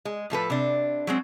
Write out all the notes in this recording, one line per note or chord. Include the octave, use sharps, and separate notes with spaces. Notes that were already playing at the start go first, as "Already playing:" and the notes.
G#3
A2 F3 A4 B4
C3 D4
F#3 G#3 C4